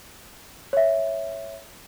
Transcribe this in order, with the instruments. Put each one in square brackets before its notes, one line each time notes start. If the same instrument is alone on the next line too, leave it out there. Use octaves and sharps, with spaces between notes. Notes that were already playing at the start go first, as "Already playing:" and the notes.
[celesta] C#5 E5